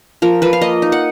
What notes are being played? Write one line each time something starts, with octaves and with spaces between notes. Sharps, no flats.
F3 A#4
F3 B4
F5
A#3 D#5
D#4
F#5